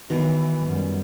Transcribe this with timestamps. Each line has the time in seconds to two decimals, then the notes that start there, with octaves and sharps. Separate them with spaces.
0.10 B2 D#3 E3
0.65 F#2 G3